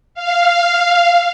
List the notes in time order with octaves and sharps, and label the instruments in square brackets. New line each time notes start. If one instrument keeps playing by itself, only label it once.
[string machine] F5